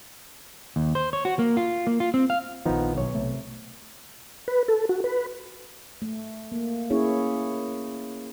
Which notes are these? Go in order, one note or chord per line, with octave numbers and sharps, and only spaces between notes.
D#2
C5
C#5
F#4
A#3
F4
A#3
F4
C4
F5
A#1 D#3 F3 B3 D#4
B1 C#5
C3 A3
B4
A4
F#4
B4
A3
A#3
A#3 C#4 E4 G#4 C#5